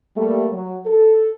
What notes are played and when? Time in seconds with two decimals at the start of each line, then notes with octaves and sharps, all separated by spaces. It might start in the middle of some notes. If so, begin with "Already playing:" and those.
0.16 G3 A3 A#3
0.52 F#3
0.86 A4